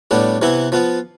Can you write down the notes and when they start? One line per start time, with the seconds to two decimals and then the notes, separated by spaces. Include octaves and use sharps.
0.11 A2 G3 B3 D4
0.42 C3 E3 B3 E4
0.72 F3 B3 F4